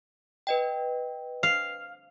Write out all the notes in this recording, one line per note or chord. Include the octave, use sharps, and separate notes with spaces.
B4 D#5 G5
F5